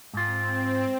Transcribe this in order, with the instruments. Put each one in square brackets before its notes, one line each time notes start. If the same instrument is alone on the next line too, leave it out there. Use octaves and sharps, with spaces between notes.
[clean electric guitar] G#2 F4 [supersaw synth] C4